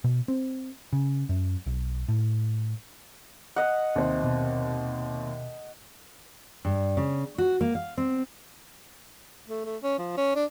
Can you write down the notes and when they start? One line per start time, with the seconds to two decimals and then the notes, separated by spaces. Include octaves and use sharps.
0.04 B2
0.28 C4
0.93 C#3
1.29 F#2
1.66 B1
2.08 A2
3.56 D#5 F#5
3.96 D#2 C3 C5
4.24 B2
6.65 G2
6.97 C#3
7.38 F#4
7.61 A#3
7.75 F5
7.97 C4
9.49 A3
9.65 A3
9.83 C#4
9.99 F3
10.17 C#4
10.36 D4